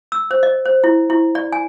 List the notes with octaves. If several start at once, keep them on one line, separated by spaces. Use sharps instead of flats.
E6
C5
D#5
C5
E4
E4
D5
G#5